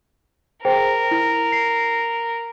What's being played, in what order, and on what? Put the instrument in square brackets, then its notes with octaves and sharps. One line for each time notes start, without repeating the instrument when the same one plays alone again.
[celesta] G#4 C5 G5 [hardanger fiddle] A#4
[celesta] E4
C7